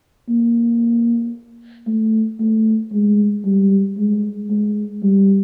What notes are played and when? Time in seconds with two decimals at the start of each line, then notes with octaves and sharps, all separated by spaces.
0.29 A#3
1.87 A3
2.40 A3
2.92 G#3
3.45 G3
3.98 G#3
4.50 G#3
5.03 G3